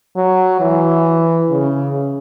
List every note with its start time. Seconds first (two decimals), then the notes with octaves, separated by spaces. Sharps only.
0.16 F#3
0.61 E3
1.50 C#3